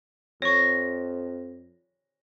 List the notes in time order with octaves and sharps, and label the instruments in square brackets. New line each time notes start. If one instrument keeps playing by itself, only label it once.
[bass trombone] F2 [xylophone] C#5 C#6 [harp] A#6